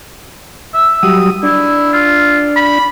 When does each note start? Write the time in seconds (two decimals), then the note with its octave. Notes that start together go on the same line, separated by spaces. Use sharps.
0.74 E5
1.03 F#3 G3 D#6
1.43 D4 E4
1.93 F4
2.56 B5